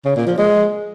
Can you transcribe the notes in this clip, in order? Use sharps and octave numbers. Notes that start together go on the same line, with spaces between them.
C#3
A#2
F3
G#3